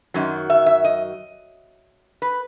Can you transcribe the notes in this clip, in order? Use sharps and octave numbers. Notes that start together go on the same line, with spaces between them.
F#2 D#3 F#3
E5
E5
D#5
B4